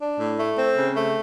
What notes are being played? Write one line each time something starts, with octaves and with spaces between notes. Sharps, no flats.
D4
A2
A3
C4
C#3
A3